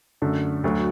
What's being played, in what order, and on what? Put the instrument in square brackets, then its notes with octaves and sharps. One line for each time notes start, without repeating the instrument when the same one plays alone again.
[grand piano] F#2 D3 A3
D2 D3 F#3